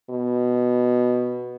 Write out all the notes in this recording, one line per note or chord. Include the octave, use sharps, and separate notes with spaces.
B2